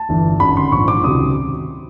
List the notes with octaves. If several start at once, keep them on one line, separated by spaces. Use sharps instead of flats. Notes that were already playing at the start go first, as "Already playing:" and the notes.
Already playing: A5
G1 G2 E3
G#1 F#2 D3 B5
C6
A#1 G#2 F3 C#6
D6
C#2 C3 D#3 F#3 D#6